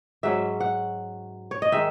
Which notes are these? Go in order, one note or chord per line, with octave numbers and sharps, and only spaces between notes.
G#2 F#3 C#4 E5
F#5
C#5
D#5
D#3 G#3 E5